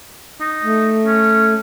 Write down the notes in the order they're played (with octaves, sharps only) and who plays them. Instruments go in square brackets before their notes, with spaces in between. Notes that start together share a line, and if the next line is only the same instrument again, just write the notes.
[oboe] D#4
[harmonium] A3
[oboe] C#4